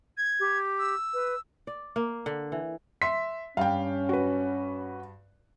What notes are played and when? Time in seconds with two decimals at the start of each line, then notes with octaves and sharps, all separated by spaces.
0.18 G#6
0.40 G4
0.79 E6
1.14 B4
1.67 D5
1.96 A#3
2.26 D3
2.52 E3
3.02 E5 C6 B6
3.57 G2 C#4 F5 G5
4.09 F#4 B4